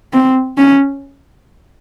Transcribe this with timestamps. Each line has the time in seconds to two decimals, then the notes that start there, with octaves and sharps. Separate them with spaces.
0.13 C4
0.58 C#4